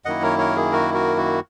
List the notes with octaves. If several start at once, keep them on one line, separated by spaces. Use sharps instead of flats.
F#2 D#3 A#3 E4 D#5 F#5
A#4 C#5
A#4 C#5
G#4
F#4 A#4
F#4 A#4
F#4